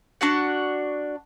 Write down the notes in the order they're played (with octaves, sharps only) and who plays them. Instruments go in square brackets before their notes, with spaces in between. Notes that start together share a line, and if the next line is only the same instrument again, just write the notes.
[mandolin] D4 F#4 F#5